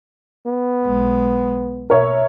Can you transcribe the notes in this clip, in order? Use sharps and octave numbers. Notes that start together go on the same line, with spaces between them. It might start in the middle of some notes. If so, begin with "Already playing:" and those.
B3
B1 G#3
B2 A#4 C#5 E5